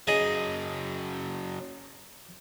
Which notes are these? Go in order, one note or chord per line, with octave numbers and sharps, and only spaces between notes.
C#3 F#3 G#4 D#5